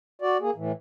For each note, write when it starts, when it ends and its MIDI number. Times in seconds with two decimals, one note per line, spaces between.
0.22 0.37 66
0.22 0.37 74
0.41 0.51 58
0.41 0.51 68
0.56 0.72 45
0.56 0.72 52